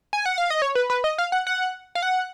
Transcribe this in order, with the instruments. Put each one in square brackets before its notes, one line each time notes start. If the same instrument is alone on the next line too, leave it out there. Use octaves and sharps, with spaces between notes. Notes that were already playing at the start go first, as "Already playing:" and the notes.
[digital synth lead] G#5
F#5
F5
D#5
C#5
B4
B4
D#5
F5
F#5
F#5
F5
F#5